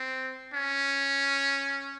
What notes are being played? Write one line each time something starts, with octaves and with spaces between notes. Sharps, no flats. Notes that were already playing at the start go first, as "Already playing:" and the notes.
Already playing: C4
C#4